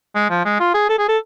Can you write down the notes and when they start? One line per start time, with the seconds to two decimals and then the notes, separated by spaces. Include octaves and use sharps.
0.15 G#3
0.30 F3
0.45 G#3
0.60 F4
0.74 G#4
0.89 A4
0.99 G#4
1.09 A4